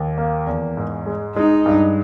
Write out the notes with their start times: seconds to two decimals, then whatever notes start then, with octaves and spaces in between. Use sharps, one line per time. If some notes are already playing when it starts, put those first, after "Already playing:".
Already playing: D#2
0.18 A#3
0.47 E2
0.77 G#2
1.07 G#3
1.36 G#3 D#4
1.66 G2